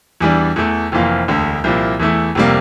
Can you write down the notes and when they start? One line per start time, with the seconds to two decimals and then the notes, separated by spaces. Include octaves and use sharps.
0.21 E2 E3 G3 D4
0.56 E2 E3 A3
0.92 F1 F2 E3 A#3 F4
1.28 E1 D2 D3
1.64 C2 A#2 F3 A#3 E4
2.00 E2 E3 A3 E4
2.35 F1 C3 G3 A#3